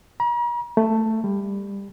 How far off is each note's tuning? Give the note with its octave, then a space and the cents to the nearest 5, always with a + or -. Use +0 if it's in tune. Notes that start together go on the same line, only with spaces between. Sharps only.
A#5 +45
A3 +10
G3 +25